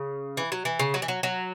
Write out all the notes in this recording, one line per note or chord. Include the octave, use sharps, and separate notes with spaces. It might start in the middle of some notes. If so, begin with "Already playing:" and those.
Already playing: C#3
E3
F#3
E3
C#3
F#3
E3
F#3
F#3